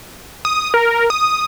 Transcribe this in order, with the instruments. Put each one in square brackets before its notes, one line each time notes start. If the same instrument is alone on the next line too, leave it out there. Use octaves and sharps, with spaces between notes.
[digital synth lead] D#6
A#4
D#6